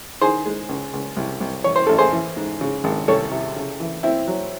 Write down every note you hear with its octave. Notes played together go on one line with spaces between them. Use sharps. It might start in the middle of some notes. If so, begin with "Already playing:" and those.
D#3 G#4 C5
G#3
C#2
C#2
C2
C2
E3 C#5
C5
A1 A4
G#4 C5
E3
G#2
C#3
G#1
C2 A4 C#5
C3
C#3
E3
C4 E4
F#3